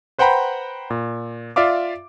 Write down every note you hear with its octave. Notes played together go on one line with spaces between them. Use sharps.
B4 C5 F#5 G5 A#5 B5
A#2
F4 D5 E5 F5 D6